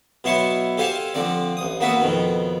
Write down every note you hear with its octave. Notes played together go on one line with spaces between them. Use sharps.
B2 F#3 E4 A5 C6 C#6
G4 A4 C5 F5 G#5 A5
D3 F3 C4 D5
A1 D#6
A#3 B3 F#4 B4 E5
F2 B2 D#3